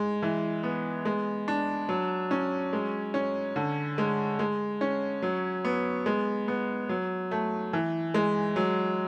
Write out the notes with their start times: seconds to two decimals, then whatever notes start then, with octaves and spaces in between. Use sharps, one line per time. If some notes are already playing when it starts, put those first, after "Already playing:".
Already playing: G#3
0.23 E3
0.63 B3
1.05 G#3
1.48 D4
1.89 F#3
2.31 C#4
2.73 G#3
3.14 C#4
3.56 D3
3.98 G#3
4.39 G#3
4.81 C#4
5.22 F#3
5.65 B3
6.06 G#3
6.48 B3
6.89 F#3
7.31 A3
7.73 E3
8.14 G#3
8.56 F#3